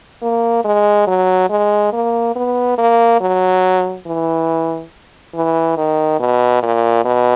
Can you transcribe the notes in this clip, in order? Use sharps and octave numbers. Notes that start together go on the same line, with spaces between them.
A#3
G#3
F#3
G#3
A#3
B3
A#3
F#3
E3
E3
D#3
B2
A#2
B2